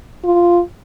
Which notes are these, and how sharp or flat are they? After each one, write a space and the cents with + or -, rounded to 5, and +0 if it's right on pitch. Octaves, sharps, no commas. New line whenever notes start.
F4 -5